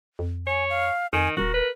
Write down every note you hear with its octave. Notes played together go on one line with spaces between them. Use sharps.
F2
C#5 G#5
F5
F2 D#3 G#5
D#1 F#4 A#4
B4